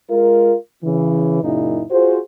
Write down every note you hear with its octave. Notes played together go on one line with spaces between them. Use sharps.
G#3 F4 A#4
C#3 E3
F#2 A#2 C#3 D#4 E4
F4 F#4 G#4 C5